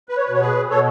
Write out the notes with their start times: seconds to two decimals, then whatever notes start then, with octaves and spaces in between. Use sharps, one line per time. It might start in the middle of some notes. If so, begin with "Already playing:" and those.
0.09 B4
0.17 C#5
0.24 B4
0.29 B2 C#5
0.41 G#4 B4
0.70 B2 A4 C#5